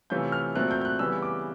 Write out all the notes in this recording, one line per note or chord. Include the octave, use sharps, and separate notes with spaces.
C3 E3 A3 C#4 F4 G6
F6
A#2 F#3 A3 C4 F#6
G6
G6
F#6
C#3 E3 G3 B3 E6
D6